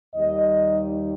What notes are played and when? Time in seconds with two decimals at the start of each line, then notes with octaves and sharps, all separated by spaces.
0.15 D#2 D#3 G3 D#5